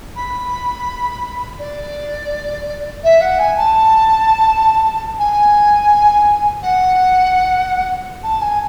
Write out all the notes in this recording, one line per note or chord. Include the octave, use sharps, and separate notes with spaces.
B5
D5
E5
F#5
G#5
A5
G#5
F#5
A5
G#5